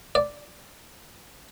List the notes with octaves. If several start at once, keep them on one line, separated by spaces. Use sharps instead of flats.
D5